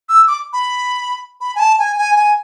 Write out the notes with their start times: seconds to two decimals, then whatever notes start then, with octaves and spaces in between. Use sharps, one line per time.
0.09 E6
0.27 D6
0.53 B5
1.41 B5
1.55 G#5
1.59 A5
1.79 G#5
1.98 G#5
2.16 G#5